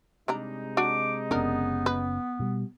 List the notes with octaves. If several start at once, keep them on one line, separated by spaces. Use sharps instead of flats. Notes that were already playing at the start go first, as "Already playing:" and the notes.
C3 G3 G#3 D4 D#4 A#5
D4 F#4 D6
F#1 B3 C#4 D4 A#4
B4
B2 G3